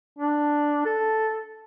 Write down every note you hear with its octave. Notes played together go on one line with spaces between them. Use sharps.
D4
A4